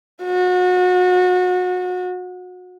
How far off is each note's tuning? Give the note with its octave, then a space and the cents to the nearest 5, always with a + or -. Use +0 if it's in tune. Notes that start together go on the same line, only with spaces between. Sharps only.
F#4 -30